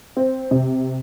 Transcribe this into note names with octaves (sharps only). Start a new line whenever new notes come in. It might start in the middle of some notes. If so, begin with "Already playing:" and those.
C4
C3